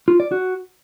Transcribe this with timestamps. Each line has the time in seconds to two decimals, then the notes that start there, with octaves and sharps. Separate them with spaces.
0.08 F4
0.20 D5
0.32 F#4